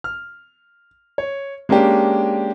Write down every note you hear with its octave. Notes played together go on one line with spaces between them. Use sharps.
F6
C#5
G#3 A#3 C#4 D4 G4